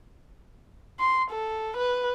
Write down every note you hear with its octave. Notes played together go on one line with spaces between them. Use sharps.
C6
A4
B4